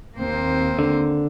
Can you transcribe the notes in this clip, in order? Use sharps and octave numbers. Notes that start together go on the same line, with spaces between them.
D#2 A#3 C4 C5
D3